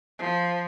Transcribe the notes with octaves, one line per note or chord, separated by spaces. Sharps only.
F3